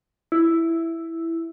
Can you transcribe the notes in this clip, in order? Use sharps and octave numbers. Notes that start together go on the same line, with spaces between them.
E4